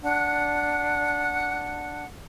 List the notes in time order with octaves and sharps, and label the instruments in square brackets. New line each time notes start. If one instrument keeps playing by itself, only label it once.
[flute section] D4 F#5